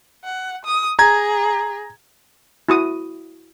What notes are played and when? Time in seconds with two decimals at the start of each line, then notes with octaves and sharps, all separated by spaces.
0.24 F#5
0.65 D#6
0.99 G#4 A#5 G#6
2.69 E4 F#4 D#6